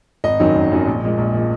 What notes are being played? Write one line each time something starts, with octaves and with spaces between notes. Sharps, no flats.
G#1 D#5
F#2 D#3 F#3
G#1
F#2 D#3 F#3
A#1
A#2 G#3
A#1
A#2 G#3